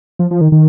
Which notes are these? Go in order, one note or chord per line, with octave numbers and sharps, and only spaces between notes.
F3
F3
D#3
D#3